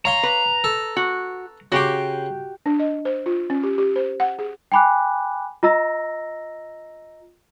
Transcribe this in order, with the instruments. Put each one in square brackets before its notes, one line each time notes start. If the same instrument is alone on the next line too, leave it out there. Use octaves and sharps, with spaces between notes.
[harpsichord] C#5 F5 C6 [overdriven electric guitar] A#5
[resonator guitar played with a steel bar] B4
[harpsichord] A4
[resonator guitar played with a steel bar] F#4
[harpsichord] C#3 C6 [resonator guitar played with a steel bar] F#4 G4 G5
[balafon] D4
D#5
C5
F4
C#4
G4
G4
C5
F#5
G#4
[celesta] G5 G#5 B5 D6 F#6
F4 D#5 A#5 E6 A#6